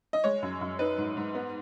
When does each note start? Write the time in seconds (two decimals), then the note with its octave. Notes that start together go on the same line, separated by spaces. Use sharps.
0.13 D#5
0.24 G#3 C#5
0.42 F#2
0.61 F#2
0.79 D#4 B4
0.98 G#2
1.17 G#2
1.35 B3